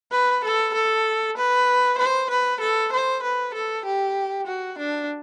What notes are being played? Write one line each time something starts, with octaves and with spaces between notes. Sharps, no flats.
B4
A4
A4
B4
C5
B4
A4
C5
B4
A4
G4
F#4
D4